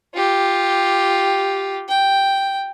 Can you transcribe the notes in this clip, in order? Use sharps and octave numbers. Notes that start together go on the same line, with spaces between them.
F4 G4
G5